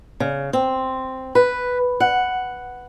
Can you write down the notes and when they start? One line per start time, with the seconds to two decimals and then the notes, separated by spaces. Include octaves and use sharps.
0.20 C#3
0.53 C4
1.35 B4
2.00 F#5